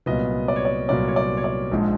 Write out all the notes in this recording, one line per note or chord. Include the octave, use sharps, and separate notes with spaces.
C2 A#2 F#3 B3 D#5
D5
C#5
D5
C2 A#2 F#3 B3 D5
C#5
D5
C#5
D5
A#1 G#2 F3 G#3